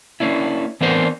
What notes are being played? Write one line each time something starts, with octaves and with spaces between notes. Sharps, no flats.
A#3 C#4 D4 E4
E3 B3 C4 D4 A#4 C5